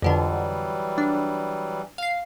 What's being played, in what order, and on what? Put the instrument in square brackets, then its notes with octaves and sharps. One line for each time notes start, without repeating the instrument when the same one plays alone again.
[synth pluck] F2 B2 D3 [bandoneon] E3 F#3 G3
[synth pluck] D4
F5 C7